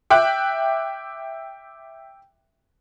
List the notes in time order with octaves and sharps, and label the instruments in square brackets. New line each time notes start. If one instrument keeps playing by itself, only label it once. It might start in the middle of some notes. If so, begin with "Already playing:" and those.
[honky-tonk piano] E5 G5 D6 F#6